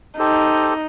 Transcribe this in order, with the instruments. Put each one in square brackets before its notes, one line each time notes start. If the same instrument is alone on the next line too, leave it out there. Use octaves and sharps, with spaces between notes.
[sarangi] D#4 [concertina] G4 A4 C5